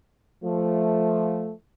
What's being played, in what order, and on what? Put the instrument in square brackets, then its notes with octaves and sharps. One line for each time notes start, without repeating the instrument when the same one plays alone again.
[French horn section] F3 A3